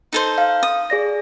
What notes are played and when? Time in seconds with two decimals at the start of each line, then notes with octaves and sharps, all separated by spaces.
0.12 D#4 A4 C5
0.38 F5
0.63 D#6
0.90 G#4 D5 A#6